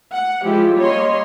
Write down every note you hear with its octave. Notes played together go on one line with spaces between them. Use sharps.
F#5
F3 G#3 E4 F4 G4
G3 A#3 C#4 C#5 D#5 C6